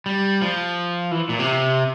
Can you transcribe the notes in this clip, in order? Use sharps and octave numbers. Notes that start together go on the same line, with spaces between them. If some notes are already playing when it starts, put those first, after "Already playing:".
G3
F3
E3
A#2
C3